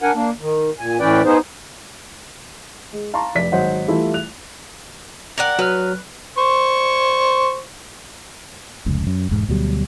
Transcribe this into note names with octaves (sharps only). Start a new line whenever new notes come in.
D4 A#4 F#5 G#5
A#3 D4
D#3
A#2 G#5
A2 E3 C#4 B4 D5 G5
B3 D#4 G#4 C5
G#3
F5 A5 A#5 C6 C#6
F1 D5 B6
G#1 F#3 C5 D#5 F#5
E3 G3 A3 E4 F4
F#6 F7
A#4 D5 F#5
F#3 B4 F6
C5 C#6
F1 C#2
F#2
E1 G#2
D2 B2 F#3 G3